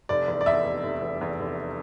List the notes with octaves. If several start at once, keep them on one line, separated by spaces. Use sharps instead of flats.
F1 D5
E2
D5
E2 E5
F1
F1
E2
E2
F1